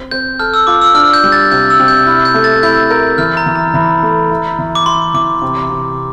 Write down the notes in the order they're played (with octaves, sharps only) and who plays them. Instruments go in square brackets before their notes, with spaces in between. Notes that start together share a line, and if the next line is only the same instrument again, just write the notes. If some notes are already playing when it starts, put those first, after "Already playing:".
Already playing: [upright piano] C4
[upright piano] C4 [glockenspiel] G6
[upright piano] A4 [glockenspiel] F6
[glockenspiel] E6
[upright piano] F4 [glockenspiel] D6
[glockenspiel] E6
[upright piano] D4 [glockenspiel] F6
[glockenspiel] G6
[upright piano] G3
[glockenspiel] A6
[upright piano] C3 [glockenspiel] G6
[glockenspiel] E6
[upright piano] C3
[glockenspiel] G6
[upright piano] E4 [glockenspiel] F6
[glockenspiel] G6
[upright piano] A3
[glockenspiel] A6
[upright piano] E4 [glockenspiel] G6
[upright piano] A#4 [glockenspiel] G6
[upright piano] E3 [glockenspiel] F6
[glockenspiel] A#5
[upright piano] E3
[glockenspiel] A#5
[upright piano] E3
A3
E4
E3
[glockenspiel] D6
[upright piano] E4 [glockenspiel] C6
[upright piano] E3 [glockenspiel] D6
[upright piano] C3
C3